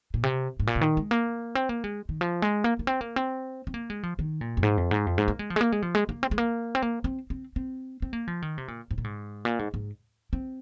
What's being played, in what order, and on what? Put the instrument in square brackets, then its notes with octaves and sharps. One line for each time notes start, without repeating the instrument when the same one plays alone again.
[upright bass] A#2
C3
G#2
A#2
C3
D#3
G#3
A#3
C4
A#3
G#3
D#3
F3
G#3
A#3
A#3
C4
A#3
C4
C4
A#3
G#3
F3
D#3
A#2
F2
G#2
F2
G#2
F2
G#2
A#3
G#3
F3
G#3
A#3
G#3
F3
G#3
A#3
C4
G#3
A#3
C4
A#3
C4
C4
C4
C4
A#3
F3
D#3
C3
A#2
G#2
A#2
G#2
A#2
G#2
G#2
C4